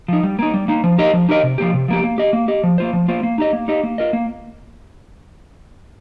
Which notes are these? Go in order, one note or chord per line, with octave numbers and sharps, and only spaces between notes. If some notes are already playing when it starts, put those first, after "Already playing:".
F3 D#4
G3
A#3 D#4
G3
A#3 D#4
F3
D#4 G4 A#4 D#5
F3
D#4 G4 A#4 D#5
C3
F3 A#3 G4
C3
F3 A#3 G4
A#3
G4 D#5
A#3
G4 D#5
F3
A#3 F4 C5
F3
A#3 F4 C5
A#3
D#4 G4 D#5
A#3
D#4 G4 D#5
A#3
F4 A#4 D#5
A#3